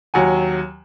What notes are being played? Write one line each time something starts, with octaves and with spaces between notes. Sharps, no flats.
D#2 F#3 F#5 G#5